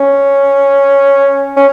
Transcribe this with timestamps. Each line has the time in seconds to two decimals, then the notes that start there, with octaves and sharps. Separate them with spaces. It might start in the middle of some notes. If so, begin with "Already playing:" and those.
Already playing: C#4
1.57 C#4